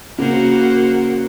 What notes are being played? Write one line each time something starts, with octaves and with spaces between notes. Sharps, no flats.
C#3 A#3 F#4 A#4 C5 F#5